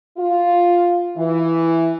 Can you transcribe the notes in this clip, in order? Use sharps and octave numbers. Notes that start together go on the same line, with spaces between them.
F4
E3